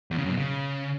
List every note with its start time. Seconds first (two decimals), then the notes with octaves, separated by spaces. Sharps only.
0.11 E2
0.17 C#3
0.24 F#2
0.31 B2
0.37 C#3